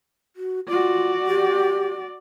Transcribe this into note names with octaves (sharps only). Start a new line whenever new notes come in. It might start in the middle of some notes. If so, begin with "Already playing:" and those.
F#4
F4 F#4 D5
G4